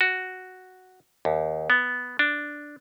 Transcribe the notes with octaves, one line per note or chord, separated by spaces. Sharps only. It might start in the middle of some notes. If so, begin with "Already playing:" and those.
F#4
D#2
B3
D4